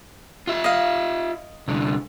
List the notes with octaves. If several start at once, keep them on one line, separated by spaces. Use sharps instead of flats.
F4 E5
D#5 F5
C2 D3